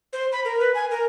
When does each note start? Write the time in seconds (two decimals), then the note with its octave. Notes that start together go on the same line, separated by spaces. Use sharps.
0.13 C5
0.32 B5
0.45 A#4
0.60 B4
0.74 G#5
0.91 A#4